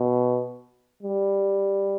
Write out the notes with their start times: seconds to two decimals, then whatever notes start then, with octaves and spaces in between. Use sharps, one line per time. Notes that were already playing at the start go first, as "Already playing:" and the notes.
Already playing: B2
1.03 G3